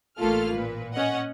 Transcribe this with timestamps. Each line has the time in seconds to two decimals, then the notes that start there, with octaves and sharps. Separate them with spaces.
0.19 A1 A3 A#3 F4 A4 F6
0.55 A#2 B4
0.94 C#4 D#5 F#5